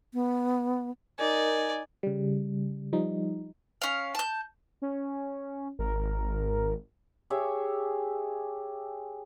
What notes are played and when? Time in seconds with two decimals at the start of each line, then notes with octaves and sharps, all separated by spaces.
0.14 B3
1.19 D#4 A#4 D5 G#5
2.03 C#3 G3
2.93 F3 G3 D#4
3.82 C#4 F5
4.15 A5 G6
4.82 C#4
5.79 G#1 A#4
7.30 G4 G#4 C#5 E5